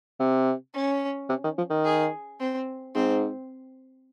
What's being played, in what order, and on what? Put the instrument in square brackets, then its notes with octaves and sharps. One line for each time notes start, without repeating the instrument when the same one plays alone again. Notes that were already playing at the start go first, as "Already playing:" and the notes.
[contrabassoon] C3
[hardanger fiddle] C#4
[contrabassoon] C3
D#3
F3
D#3
[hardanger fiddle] G#4
C4
[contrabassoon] G#2 [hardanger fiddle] C4